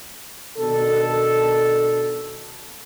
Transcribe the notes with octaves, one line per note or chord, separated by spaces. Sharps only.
B2 D#3 D4 A4